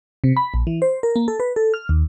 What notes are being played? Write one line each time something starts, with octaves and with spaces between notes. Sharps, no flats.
C3
B5
A#1
E3
C5
A#4
A#3
A4
B4
A4
F6
D#2